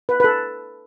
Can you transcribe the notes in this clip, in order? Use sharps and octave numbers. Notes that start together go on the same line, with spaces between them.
B4
B4
A4